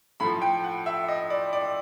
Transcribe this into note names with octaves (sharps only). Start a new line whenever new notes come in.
A2 F3 B5
G5
F#5
E5
D#5
D5
D5